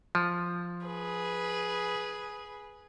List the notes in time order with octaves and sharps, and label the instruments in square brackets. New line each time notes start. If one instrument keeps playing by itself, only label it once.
[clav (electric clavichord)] F3
[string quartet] G#4 B4